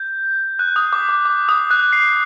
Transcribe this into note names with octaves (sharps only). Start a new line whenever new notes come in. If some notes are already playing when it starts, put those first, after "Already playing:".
Already playing: G6
F#6
D#6
D6
D6
D6
D#6
F#6
C7